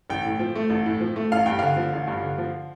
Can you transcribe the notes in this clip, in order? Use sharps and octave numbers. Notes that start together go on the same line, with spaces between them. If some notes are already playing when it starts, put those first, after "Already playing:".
A1 G5
A2
F3
A3
A1
A2
F3
A3
A1 F5
G2 G5
D3 F5
F3
A1
G2
D3
F3